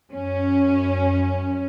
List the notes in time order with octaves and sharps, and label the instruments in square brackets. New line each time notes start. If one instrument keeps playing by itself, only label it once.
[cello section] F#2 C#4